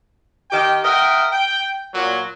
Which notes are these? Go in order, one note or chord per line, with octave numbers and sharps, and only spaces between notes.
D#3 G4 G5
A#4 D#5 E5 F#5 G5
G5
A#2 F#3